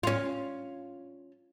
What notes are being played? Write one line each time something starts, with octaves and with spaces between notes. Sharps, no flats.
C#4 F4